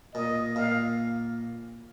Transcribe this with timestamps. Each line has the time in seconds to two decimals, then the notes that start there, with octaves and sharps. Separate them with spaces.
0.14 A#2 D#5
0.56 A#2 F5